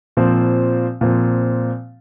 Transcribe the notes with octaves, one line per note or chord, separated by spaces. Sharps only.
A#2 F3 C4
A#2 F3 C4